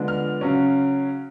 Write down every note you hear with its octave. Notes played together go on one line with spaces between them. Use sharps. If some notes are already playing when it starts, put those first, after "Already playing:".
Already playing: D3 F3 G#3 B3 D4
F6
C#3 F#3 C#4